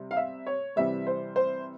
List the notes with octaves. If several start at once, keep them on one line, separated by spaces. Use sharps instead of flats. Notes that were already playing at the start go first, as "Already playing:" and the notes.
Already playing: C3 G3 C4
F5
E5
C#5
C3 E3 G3 C4 E5
C5
C5